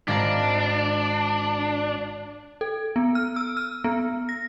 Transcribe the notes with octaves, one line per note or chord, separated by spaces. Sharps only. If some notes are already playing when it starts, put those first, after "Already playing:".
G#1 D4 F5 A#5
A4
B3
F6
E6
F6
B3
A#6